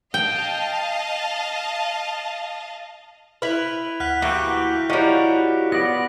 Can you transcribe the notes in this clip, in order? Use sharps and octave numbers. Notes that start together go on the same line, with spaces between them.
D#5 F5 G5 A5
E4 B4 F6 F7
D2 F#5 F6 F#6 B6
E3 A#3 F#4 G4 F#6 D7 G7
F3 G3 E4 F#4 A#4 C#5 D#5 D6
B3 D5 A#6